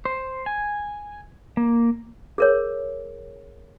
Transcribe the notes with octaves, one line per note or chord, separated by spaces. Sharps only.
C5
G#5
A#3
G#4 A#4 C#5